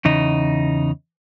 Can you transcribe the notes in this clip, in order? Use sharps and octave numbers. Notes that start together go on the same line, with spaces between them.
E2 C#3 D#4